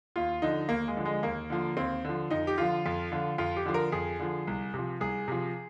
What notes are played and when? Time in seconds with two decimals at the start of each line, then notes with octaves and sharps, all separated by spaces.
0.16 D#2 F4
0.42 D3 F3 D#4
0.69 D#2 A#3
0.88 G#3
0.97 D3 F3
1.05 G#3
1.23 D#2 A#3
1.50 D3 F3
1.77 D#2 C4
2.05 D3 F3
2.31 F2 D#4
2.47 G4
2.58 D3 F3 F4
2.86 F2
3.12 D3 F3
3.38 F2 F4
3.57 G4
3.66 D3 F3
3.74 A#4
3.92 F2 G#4
4.19 D3 F3
4.47 C2
4.74 C3 F3
5.01 C2 G#4
5.28 C3 F3